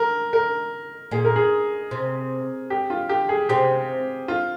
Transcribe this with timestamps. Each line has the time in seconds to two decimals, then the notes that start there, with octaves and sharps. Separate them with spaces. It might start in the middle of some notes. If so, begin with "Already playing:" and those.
Already playing: A#4
0.33 A#4
1.11 A#2 G#4
1.25 A#4
1.36 G#4
1.91 C3
2.70 G4
2.90 F4
3.09 G4
3.29 G#4
3.49 C3 G4
4.28 F4